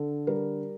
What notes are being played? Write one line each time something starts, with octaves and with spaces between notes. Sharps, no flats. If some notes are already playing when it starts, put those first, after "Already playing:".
Already playing: D3 A4
G3 A#4